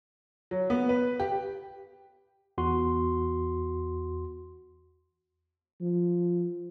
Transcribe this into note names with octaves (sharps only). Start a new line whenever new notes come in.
F#3
B3
B4
G4
E2 F#4 C6
F3